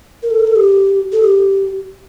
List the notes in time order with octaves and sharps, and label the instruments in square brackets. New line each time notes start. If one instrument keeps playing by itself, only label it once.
[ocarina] A#4
A4
A#4
A4
G4
A4
G4